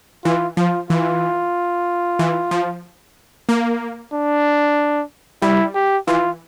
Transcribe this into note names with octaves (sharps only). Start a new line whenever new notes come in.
E3 F4
F3 F4
E3 F4
E3
F3
A#3
D4
G3 E4
G4
E3 F4